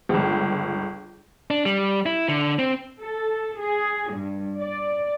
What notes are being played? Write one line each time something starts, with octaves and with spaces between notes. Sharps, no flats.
G1 C#2
D4
G3
E4
D3
C4
A4
G#4
G2
D5